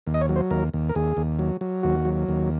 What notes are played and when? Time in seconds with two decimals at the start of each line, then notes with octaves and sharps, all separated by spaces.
0.07 D#2
0.14 D#5
0.21 C#5
0.29 F#3
0.36 C5
0.51 D#2 A#4
0.74 D#2
0.89 A#4
0.95 D#2 G#4
1.17 D#2
1.39 F#3
1.61 F#3
1.83 D#2 F#4
2.05 F#3
2.28 D#2